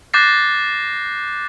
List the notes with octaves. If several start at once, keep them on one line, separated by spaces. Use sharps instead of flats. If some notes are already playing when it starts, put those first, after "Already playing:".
D6 F#6 G6 A6 A#6 C7